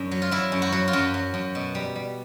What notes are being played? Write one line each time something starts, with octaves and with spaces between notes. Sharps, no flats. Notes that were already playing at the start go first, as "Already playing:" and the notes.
Already playing: F#2 D4
F#3
F4
F#3 E4
F#2
F#4
F#3
F4
F#2 F#4
F#3
F#2
B2
G3
G3